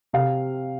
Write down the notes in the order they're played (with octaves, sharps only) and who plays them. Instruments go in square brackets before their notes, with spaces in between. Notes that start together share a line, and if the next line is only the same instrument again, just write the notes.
[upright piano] C3 F5